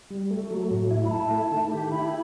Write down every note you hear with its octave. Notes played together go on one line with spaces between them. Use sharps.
G3
A3
F#3
A2
E4
B5
E4 A5
A3
D#3
G4
E4 B5